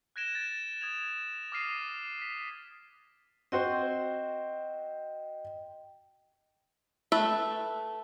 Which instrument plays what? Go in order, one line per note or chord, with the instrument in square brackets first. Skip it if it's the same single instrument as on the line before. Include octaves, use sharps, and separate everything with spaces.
[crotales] F#6 G#6 A#6 D7 E7 G7
A6
D#6 G#6 F7
D6 D#6 F6 A#6 C7 D#7
B6
[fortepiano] C4 F#4 C5 [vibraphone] D#5 G5
[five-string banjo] A3 B4 E5